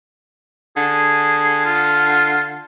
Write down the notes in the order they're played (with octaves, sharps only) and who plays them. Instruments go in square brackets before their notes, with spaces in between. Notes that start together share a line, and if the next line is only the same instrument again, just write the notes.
[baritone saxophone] D3 [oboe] G#4
[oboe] F4